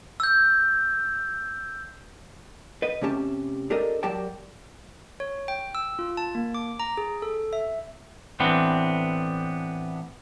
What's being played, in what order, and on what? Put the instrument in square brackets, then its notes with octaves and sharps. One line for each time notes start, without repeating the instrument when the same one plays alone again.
[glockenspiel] E6 G6
[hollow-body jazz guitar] B4 D#5
C3 A3 C#4 G4 A5
D4 G4 A4 A#4 D#5
F#3 G4 A#4 D5 G5 A5
[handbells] C#5
G5
E6
F4
A5
A#3
D6
A#5
G#4
A4
E5
[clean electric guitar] A2 E3 B3 C4 D4